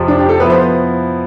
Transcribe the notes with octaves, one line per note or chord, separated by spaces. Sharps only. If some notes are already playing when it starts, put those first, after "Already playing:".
Already playing: F2 C3 F3
D4
G4
A4
F3 B3 E4 B4
C5